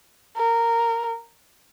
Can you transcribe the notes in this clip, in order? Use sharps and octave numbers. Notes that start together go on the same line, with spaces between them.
A#4